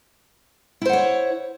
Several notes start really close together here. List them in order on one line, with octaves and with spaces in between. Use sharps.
E4 C5 F#5 C#5